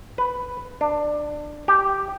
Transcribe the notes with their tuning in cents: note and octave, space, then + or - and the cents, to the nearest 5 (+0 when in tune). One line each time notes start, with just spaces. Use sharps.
B4 +5
D4 +20
G4 -5